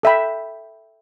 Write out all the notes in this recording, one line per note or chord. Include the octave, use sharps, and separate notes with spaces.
A4 E5 G5 B5